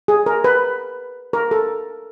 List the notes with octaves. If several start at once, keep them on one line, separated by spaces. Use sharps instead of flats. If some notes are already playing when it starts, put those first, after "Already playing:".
G#4
A#4
B4
A#4
A4